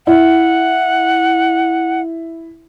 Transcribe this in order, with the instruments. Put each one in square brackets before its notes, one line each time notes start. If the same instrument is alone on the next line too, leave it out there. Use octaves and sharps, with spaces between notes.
[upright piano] E4 [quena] F#5